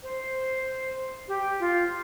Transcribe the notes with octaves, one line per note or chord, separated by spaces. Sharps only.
C5
G4
F4